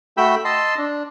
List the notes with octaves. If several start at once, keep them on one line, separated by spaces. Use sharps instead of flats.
A3 F#4 G5 B5 E6
D#5 A5 C6 E6
D4